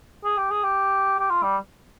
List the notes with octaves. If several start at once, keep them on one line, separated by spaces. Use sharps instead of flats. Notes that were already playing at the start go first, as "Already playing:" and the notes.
G#4
G4
G#4
G4
G4
F4
G3